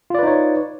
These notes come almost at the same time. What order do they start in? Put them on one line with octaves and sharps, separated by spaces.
F4 D5 B4 D#4 C#5